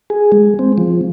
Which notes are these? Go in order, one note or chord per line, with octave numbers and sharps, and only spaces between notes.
G#4
G#3
C4
F3